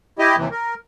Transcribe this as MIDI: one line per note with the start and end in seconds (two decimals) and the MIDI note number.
0.19 0.36 64
0.19 0.36 67
0.19 0.36 75
0.37 0.49 39
0.37 0.49 48
0.37 0.49 52
0.51 0.74 70